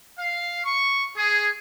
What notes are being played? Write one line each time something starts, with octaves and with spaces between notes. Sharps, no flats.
F5
C#6
G#4